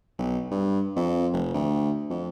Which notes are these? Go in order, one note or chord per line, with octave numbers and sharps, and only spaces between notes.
B1
G2
F2
F1
D2
F2